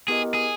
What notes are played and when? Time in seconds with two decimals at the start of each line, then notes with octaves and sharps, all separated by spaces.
0.08 B3 E4 G4 G#4 A#4 D#5
0.34 G#4